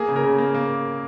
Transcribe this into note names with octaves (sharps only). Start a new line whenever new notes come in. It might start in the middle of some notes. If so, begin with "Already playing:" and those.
Already playing: A#3 G#4
C#3
A#4
C#3
A#3
A#3